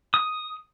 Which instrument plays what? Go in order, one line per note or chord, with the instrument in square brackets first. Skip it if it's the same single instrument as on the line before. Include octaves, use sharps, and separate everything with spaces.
[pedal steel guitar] D#6